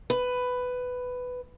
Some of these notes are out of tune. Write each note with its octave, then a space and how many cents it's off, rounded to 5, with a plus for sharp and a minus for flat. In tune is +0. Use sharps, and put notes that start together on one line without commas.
B4 +10